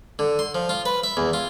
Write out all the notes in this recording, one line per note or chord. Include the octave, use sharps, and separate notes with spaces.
D3
C6
F3
F4
B4
E5
E2
F4